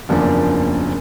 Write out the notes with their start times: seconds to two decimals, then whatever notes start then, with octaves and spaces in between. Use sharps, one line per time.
0.09 F#1 E2 F3 A#3 D4